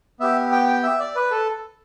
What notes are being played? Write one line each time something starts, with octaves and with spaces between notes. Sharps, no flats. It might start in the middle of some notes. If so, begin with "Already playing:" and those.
B3 G4 E5
G5
G5
E5
D5
B4
A4